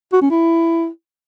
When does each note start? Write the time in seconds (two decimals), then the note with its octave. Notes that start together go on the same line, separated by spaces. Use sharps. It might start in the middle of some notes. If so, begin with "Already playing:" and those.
0.13 F#4
0.22 C#4
0.30 E4